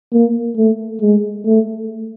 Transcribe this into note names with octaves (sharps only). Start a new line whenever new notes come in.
A#3
A3
G#3
A3